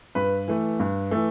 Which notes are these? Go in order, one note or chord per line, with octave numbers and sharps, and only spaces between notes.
G2 B4 B5
E3 A3
G2
E3 A3